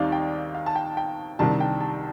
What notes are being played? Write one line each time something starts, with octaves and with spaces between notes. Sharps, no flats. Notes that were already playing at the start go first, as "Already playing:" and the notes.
Already playing: D#2 D#3 G3 C4 D#4 D5 F5
G5
F5
A5
G5
G5
C2 C3 D#3 G3 D4 A5
G5
A5